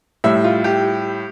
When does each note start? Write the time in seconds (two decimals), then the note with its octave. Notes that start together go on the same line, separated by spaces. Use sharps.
0.24 A2 G3 E5
0.44 F4
0.64 G4